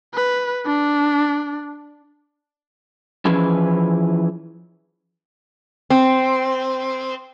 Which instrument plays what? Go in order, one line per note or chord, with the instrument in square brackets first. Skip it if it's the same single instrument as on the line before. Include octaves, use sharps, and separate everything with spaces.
[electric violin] B4
D4
[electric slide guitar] E3 F3 C#4 E4 G#4 B4
[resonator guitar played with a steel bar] C4